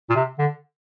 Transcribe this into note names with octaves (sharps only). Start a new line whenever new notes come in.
A#2
C3
D3